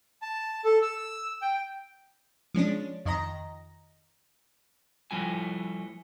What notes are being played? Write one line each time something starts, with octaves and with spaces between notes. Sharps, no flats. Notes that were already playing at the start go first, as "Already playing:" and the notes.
A5
A4
E6
G5
F3 G#3 C#4 D4
F2 D#3 D#5 A#5 A#6
F3 G3 A3 E4 F#4 G#5